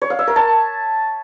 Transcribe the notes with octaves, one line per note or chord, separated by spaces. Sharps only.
C#5
F5
E5
A#4
A5